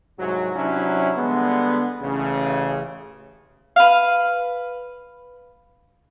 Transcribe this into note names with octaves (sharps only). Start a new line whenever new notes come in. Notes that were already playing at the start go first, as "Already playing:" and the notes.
C2 G#2 F#3
C3 F#3 C#4 D4 E4
D3 G3 G#3 B3
A1 C#3
B4 F5